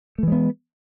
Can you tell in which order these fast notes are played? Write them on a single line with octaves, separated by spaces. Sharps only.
A3 E3 G#3 B3